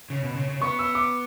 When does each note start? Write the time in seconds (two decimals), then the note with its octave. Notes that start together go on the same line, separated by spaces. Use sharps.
0.10 C#3
0.24 B2
0.36 C#3
0.49 C#3
0.62 B3 C#6
0.79 E6
0.95 D6